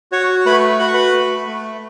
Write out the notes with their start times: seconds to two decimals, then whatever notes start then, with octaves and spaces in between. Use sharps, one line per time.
0.12 F#4 C#5 C#6
0.46 A3 B4 B5
0.79 F#4 B5
0.88 C#6
0.94 B4 B5
1.13 A3
1.47 A3